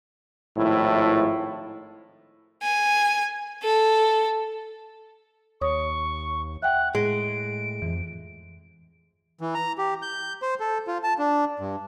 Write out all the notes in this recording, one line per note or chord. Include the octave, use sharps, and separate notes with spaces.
G#1 A2 F3 E4
G#5
A4
D#2 C#5 C#6 D#6
E5 F#5 G5 F#6
A2 G#3 G#4 D7
F2 E3
E3
A#5
G4
G6
C5
A4
F4
A5
D4
G2